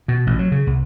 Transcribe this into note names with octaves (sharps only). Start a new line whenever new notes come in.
B2
A1
F#3
C#3
C2